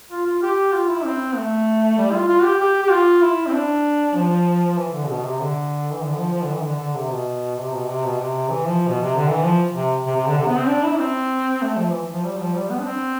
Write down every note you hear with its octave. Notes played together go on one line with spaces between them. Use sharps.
F4
F4
G4
F4
E4
C4
A3
G3
F4
F4
G4
G4
G4
F4
E4
C4
D4
F3
E3
D3
B2
C3
D3
E3
D3
F3
F3
D3
E3
D3
D3
C3
B2
C3
B2
C3
B2
C3
E3
F3
B2
C3
D3
E3
F3
C3
C3
C3
D3
C3
B3
C4
D4
E4
C4
A3
F3
E3
F3
G3
F3
G3
B3
D4
C4